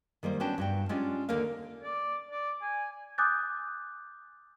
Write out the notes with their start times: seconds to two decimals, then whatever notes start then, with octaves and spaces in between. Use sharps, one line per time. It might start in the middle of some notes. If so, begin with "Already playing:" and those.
0.23 D#3 G3 A#3 C5
0.40 B3 C#4 D4 F#4 G5 A5
0.58 G2 F#4 G5
0.89 G#3 C#4 D4 F4 G4
1.29 D#2 D3 A#3 A#4 F5
1.82 D5
2.30 D5
2.62 G#5
3.18 G#5 D6 D#6 F#6 G6 A6